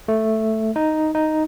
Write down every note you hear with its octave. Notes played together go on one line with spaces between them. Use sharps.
A3
D#4
D#4